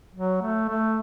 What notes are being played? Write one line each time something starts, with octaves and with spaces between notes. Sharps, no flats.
F#3
A3
A3